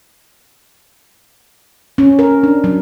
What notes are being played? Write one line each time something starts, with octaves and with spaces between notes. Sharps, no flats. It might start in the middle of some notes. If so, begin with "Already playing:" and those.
C#4
A#4
D4
F#3